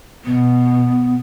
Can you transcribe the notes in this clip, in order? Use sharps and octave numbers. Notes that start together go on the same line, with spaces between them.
B2 B3